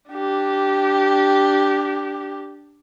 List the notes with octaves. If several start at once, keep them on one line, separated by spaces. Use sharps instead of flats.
D4 G4